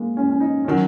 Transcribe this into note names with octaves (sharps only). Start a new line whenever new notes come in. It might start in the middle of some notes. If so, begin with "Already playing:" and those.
Already playing: G#3 A#3
C#4
C#4
D#4
D#3 F#3 C#4